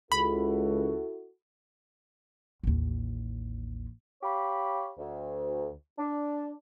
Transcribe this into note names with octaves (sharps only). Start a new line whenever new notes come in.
C#2 E4 F#4 A4 B5
A1 D#2
G4 C#5 F5 B5
D2
D4